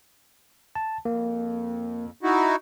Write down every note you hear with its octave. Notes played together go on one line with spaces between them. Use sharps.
A5
F2 A#3
D#4 E4 F#4